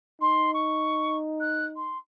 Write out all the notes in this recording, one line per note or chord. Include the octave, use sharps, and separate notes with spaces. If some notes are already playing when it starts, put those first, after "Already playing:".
D#4 C6
C#6
F#6
C6